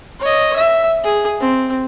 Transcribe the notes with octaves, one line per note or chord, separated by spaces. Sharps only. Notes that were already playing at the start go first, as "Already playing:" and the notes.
C#5 D#5
E5
G#4
C4